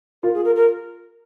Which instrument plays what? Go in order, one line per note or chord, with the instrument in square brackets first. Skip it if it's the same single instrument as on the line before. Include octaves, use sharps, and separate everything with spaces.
[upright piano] F4 [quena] A#4
[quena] G#4
A#4
A#4